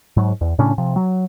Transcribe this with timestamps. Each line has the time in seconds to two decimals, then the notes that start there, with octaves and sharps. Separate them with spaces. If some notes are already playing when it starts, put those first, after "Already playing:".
0.17 G#2 F#3
0.41 E2
0.59 A2 C#3 C#4 D4
0.78 C3 F3
0.96 F#3